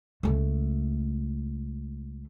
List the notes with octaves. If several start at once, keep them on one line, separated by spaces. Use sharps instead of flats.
C#2 A3